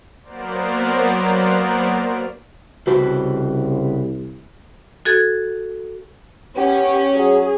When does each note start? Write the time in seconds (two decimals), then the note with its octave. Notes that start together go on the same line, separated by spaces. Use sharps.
0.23 F#3 A#3 B3 A#4 C5 D5
2.87 C2 C#3 F#4 B4 C5
5.05 F#4 A4 G#6
6.56 B3 C#4 G4
7.16 F#3 G#4